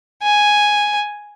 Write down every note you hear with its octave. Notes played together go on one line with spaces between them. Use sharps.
G#5